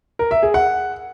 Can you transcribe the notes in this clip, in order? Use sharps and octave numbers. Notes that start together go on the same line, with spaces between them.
A#4
E5
G#4
F#5